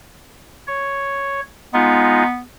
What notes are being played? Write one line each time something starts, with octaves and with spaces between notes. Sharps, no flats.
C#5
G#3 B3 D#4 F4